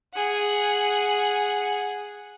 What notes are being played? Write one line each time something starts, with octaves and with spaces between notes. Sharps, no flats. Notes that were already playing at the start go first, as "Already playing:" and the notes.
G#4 F#5